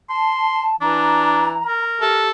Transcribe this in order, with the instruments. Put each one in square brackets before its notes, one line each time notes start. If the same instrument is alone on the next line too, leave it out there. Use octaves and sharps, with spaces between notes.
[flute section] A5 [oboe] C6
[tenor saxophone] E3 [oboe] D4 [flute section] A#5
[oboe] A#4
[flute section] G4 [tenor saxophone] A4